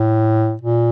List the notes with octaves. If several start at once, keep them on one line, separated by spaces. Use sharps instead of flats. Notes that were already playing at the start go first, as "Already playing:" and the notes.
Already playing: A2
A#2